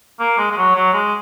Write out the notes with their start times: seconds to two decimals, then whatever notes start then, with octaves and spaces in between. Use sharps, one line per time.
0.20 A#3
0.38 G#3
0.51 G#3
0.57 F#3
0.75 F#3
0.93 G#3